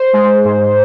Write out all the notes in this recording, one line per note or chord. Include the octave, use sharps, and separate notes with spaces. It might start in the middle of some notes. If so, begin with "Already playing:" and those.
Already playing: C5
G#3
G#2